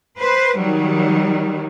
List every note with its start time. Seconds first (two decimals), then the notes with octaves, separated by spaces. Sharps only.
0.17 B4 C5
0.57 D#3 F#3 G3